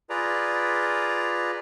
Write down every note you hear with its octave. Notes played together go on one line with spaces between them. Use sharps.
F4 G#4 B4 D5 A#5